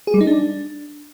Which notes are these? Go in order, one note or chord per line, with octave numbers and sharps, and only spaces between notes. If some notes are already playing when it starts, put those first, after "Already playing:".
G#4
G3
D#4
D4